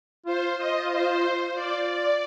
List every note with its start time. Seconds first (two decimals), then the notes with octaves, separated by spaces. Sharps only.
0.26 F4 C5
0.58 D#5
0.90 C5
1.55 F4 D5
1.87 D5